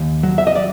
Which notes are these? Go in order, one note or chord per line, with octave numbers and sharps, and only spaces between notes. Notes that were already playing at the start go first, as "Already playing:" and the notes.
Already playing: D#2
F#3
E5
D#5
D5